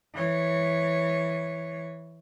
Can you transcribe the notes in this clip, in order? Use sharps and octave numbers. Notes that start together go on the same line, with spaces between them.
E3 C#5